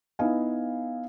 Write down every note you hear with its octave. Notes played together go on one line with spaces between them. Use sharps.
B3 D#4 E4 D#5 F5 G#5